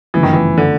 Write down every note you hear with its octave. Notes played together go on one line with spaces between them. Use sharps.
G1 F#2 C#3 E3 F3 A3
D#3
E3
D3